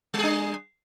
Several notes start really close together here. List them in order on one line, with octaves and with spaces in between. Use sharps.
G3 G#4 D4